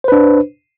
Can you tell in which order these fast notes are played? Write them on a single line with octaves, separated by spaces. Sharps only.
C5 B4 D4